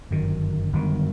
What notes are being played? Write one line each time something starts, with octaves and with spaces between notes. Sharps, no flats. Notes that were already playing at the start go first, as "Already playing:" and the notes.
G1 F#2 D#3
G1 F#2 D#3